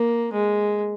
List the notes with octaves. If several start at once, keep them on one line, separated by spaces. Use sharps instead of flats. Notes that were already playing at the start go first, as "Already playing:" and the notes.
Already playing: A#3
G#3